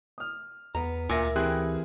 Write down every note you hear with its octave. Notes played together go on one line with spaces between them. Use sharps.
D#6 F6
E2 B3 A#5
D2 A#2 A#4 E5 G#5 A#6
E3 C4 E4 G4 G#4 F#6